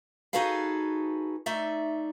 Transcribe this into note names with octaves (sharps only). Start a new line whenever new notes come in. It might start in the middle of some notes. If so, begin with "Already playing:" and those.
D#4 F#4 G#4 A4 B4 F5
A3 D#4 D5 E5